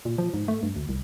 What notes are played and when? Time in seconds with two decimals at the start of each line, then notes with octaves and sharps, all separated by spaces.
0.05 A#2
0.18 F3
0.34 G#2
0.48 A3
0.63 G2
0.76 D2
0.89 C2